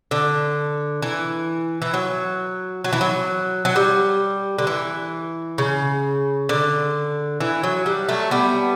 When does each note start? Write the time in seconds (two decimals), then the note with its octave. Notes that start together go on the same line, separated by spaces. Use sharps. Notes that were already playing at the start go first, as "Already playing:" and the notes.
0.11 D3
1.02 E3
1.82 E3
1.94 F#3
2.84 F#3
2.93 E3
3.01 F#3
3.65 F#3
3.76 G3
4.58 D3
4.67 E3
5.58 C#3
6.49 D3
7.40 E3
7.63 F#3
7.86 G3
8.09 F#3 A3
8.31 G3 B3